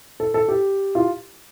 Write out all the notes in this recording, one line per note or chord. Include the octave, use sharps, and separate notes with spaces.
A4
A4
G4
F4